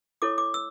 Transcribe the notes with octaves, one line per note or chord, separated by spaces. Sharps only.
E4 A4 C#5 D6
D6
E6